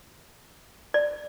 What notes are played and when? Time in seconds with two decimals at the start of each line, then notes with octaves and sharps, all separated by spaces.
0.94 D5